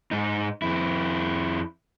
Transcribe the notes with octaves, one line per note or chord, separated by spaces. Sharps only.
G#2 D#4
F2 E4